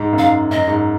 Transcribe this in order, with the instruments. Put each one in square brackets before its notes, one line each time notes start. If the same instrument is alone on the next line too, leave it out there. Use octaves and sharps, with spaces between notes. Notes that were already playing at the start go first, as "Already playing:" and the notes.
Already playing: [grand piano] G#2
F#2
[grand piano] G#2 [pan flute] F5
[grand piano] F#2 [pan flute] D#5
[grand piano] G#2